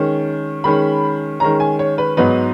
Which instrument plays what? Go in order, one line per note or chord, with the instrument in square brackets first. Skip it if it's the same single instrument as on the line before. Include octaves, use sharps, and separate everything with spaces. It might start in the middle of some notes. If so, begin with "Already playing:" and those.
Already playing: [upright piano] D#3 G#3 C#4
D#3 G#3 C#4 B5
D#3 G#3 C#4 A#5
G#5
C#5
B4
G#2 F#3 B3 D#4 B4